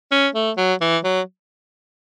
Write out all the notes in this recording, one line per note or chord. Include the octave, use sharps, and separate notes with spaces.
C#4
A3
F#3
E3
F#3